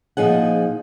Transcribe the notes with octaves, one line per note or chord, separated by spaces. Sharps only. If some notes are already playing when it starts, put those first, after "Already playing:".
A#2 F3 D#4 G#4 F#5